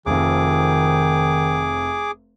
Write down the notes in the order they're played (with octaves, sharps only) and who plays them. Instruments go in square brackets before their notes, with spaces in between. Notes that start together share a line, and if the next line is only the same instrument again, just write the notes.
[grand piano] F1 F2 [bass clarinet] D#3 [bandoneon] G#4 D6